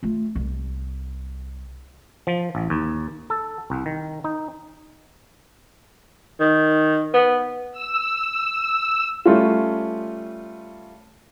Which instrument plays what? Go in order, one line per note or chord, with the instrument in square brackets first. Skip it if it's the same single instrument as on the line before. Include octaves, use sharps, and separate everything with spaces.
[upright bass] A3 F4
C2
[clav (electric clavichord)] F3
A1
D#2
A4
C2
D#3
D#4
[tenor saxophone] D#3
B3
[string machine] E6
[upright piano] G3 A3 C#4 F4